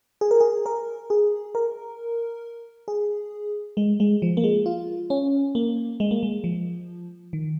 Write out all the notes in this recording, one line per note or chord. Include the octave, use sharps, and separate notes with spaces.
G#4
A#4
G#4
A#4
G#4
A#4
G#4
G#3
G#3
F3
A#3
G#3
F4
C#4
A#3
G#3
A#3
G#3
F3
D#3